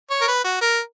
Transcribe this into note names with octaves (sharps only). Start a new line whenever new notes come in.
C#5
A#4
B4
F#4
A#4